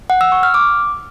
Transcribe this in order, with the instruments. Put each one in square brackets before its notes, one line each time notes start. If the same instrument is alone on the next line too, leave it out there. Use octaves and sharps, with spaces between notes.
[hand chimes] F#5
E6
C#6
F6
D6